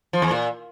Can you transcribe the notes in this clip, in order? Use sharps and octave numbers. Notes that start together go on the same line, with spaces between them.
F3
E2
A#2